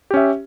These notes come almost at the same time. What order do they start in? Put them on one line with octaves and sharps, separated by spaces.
G4 C#4 E5